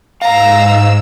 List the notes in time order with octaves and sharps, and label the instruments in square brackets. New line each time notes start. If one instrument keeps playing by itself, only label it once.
[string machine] G#2 E6 [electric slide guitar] F5 [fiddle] A#5